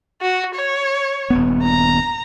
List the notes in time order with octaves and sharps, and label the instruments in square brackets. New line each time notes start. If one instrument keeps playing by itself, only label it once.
[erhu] F#4
C#5
[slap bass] D#1 G2 B3
[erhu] A#5